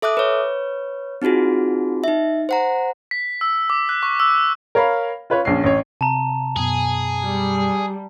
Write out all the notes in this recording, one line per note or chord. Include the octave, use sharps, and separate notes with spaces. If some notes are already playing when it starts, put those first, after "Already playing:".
A4 E5 D6 D#6 F#6
B4 C#5
C4 D#4 F4 F#4 G#4
D#4 E5
C5 F#5 A#5
B6
E6
D6
F#6
C#6
E6
A#4 C#5 F5 B5
F4 B4 C#5
A#1 C#4 C7
A1 C#5
C3 A5 A#5
F#2 B2 G#4
G3